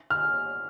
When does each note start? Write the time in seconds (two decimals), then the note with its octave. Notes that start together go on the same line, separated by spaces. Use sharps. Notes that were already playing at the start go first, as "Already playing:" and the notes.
0.10 F6